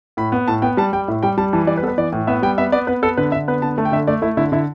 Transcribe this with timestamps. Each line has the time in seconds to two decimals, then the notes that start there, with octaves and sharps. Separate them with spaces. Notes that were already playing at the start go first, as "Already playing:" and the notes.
0.17 A2 B5
0.32 B3
0.48 A2 A5
0.62 B3 G5
0.77 G3 A5
0.93 G3 G5
1.08 A2 E5
1.23 G3 G5
1.38 G3 A5
1.53 E3 A5
1.67 G3 D5
1.77 B4
1.82 B3 A4
1.88 B4
1.98 E3 D5
2.12 A2
2.27 B3 E5
2.42 G3 G5
2.58 B3 E5
2.72 B3 D5
2.87 B3 B4
3.02 B3 A4
3.17 D3 B4
3.32 D3 E5
3.48 B3 B4
3.62 D3 A5
3.78 A3 A5
3.85 G5
3.92 D3 E5
4.07 A3 D5
4.22 A3 E4
4.37 D3 E4
4.52 D3 E4